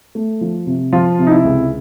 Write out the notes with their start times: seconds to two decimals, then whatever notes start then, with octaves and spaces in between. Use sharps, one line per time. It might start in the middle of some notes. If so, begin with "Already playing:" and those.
0.15 A3
0.41 F3
0.66 C3
0.92 F3 F4
1.19 C3
1.27 D#4
1.31 E4
1.44 C#2